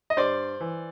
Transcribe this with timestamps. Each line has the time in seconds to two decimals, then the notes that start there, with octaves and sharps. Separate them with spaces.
0.10 D#5
0.17 G2 C5 D5
0.61 E3